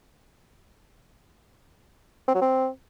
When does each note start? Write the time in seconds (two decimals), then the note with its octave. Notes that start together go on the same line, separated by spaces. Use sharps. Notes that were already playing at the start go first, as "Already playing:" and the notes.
2.28 C4
2.34 F#3
2.41 C4